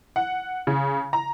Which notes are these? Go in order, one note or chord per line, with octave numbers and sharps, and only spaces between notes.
F#5
C#3
A#5